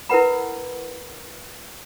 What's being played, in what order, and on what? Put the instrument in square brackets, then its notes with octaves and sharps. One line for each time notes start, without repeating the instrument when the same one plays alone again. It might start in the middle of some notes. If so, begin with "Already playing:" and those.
[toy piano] E4 A#4 B4 F#5 B5